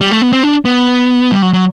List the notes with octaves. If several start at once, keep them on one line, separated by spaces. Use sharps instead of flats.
G3
A3
B3
C4
D4
B3
G3
F#3
F#3